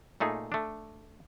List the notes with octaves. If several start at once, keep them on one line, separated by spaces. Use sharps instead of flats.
A#2 A3 D#4 G#4
A3 D4